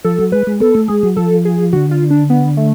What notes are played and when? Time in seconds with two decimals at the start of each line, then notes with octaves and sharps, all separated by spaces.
0.04 F3 A4
0.19 F#3
0.32 G#3 B4
0.47 G#3
0.60 B3 A4
0.75 A3
0.88 G#3 G#4
1.03 F#3
1.16 F3 A4
1.45 G#4
1.73 D3 F#4
1.91 F4
2.10 D4
2.30 B3
2.57 A3